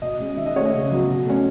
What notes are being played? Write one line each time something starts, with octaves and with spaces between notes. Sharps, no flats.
B2 D#5
G#3 C#4
D#3 E5
D#5
A3 C#4 C#5
D#5
C#3
F#3 B3
B2
A3 C#4